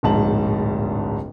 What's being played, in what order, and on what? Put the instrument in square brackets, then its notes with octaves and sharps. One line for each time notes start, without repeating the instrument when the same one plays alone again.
[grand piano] D1 A#1 G#2 A5 F#7